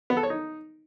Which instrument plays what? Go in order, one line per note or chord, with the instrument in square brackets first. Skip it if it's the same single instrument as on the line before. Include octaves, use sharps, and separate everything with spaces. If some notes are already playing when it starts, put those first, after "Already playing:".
[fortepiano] B3
A4
C#5
D#4